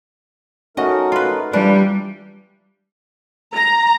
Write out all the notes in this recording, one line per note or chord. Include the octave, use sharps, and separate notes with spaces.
A3 C#4 D#4 F#4 A#4 D#5
F4 B4
E3 G3 A#3 D4 F4 G4 B4
A#5